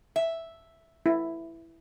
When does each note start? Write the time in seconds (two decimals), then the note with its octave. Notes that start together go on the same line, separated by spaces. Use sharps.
0.16 E5
1.06 E4